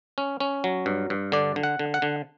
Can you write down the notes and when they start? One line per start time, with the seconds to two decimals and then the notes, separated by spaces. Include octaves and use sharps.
0.18 C#4
0.40 C#4
0.64 F#3
0.86 G2
1.10 G2
1.32 D3 D5
1.56 D3
1.63 F#5
1.79 D3
1.94 F#5
2.02 D3